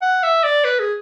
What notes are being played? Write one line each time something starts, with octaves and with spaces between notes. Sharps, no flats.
F#5
E5
D5
B4
G#4